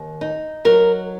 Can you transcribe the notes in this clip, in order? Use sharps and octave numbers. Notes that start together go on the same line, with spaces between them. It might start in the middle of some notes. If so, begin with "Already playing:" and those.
Already playing: D#2
D#4
F#3 A#4